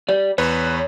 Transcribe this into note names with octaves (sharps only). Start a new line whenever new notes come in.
G4 D5
E2 B4 C#5